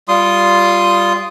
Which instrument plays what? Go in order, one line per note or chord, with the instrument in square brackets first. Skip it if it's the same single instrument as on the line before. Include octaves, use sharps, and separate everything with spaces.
[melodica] G3 F4 C6 D#6